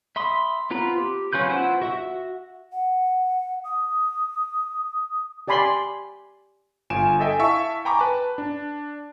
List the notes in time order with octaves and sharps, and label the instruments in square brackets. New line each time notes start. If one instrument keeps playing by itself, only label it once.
[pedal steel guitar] E5 B5 C6 D#6
B3 C4 F4 A#5 B5
G4
F#3 C#4 F4 B4 G6
B3 E4 F4 C5 F#5
F#4 E5 F#5
[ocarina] F#5
D#6
[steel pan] G4 D5 G#5 B5 C6
[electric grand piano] G1 F4 G#5 D7 E7
A4 D#5 E5 G5 G#5
E4 E5 F5 A5 C#6
G5 G#5 A#5 B5 C#6 D6
B4 A5
D4